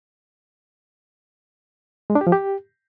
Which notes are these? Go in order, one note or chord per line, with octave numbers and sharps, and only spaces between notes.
G#3
D4
G4
F3
G4